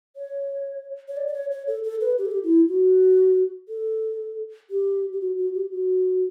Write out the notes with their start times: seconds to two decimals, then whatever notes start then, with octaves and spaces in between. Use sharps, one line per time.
0.16 C#5
1.08 C#5
1.17 D5
1.27 D5
1.34 C#5
1.51 C#5
1.67 A4
1.83 A4
2.01 B4
2.18 G4
2.25 A4
2.32 G4
2.44 E4
2.69 F#4
3.69 A4
4.70 G4
5.13 G4
5.21 F#4
5.37 F#4
5.54 G4
5.71 F#4